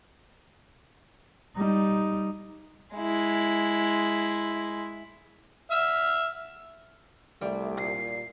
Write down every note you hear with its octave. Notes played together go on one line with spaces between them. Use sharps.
G3 D#4
G#3 E4
E5 E6 F6
C2 G3 A3 D5
A#2 C7